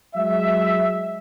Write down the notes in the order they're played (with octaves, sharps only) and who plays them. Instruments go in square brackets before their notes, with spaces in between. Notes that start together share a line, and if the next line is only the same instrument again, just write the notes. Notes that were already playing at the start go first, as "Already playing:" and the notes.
[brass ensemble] F#3 G#3 E5